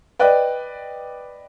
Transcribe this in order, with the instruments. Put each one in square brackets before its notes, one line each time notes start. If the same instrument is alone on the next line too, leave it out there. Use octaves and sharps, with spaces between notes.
[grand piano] B4 D5 D#5 G5 F#6